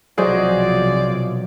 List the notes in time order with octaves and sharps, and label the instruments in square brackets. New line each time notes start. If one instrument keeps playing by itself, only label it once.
[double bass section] B1 C3 F3 [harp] F#3 [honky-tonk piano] G#4 C5 D#5 [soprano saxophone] D5